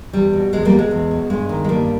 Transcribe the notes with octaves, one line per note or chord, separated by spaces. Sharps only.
E2 G3
B2
E2 G#3
G3 A#3
B2
G#3
E2
B2
G2 G#3
D#3
G#3
G2 G3 A#3